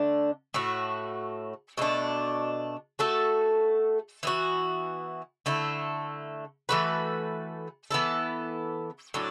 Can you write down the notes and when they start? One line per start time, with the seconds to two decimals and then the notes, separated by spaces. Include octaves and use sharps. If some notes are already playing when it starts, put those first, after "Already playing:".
Already playing: D3 A3 D4
0.54 A2 A3 F#4
1.78 B2 A3 D4
2.99 A3 F#4 A4
4.23 E3 B3 F#4
5.46 D3 A3 E4
6.69 E3 A3 F#4 B4
7.91 E3 B3 E4 A4
9.14 A2 F#3 D4